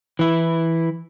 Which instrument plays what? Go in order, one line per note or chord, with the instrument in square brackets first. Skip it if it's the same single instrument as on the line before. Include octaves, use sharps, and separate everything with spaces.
[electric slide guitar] E3 E4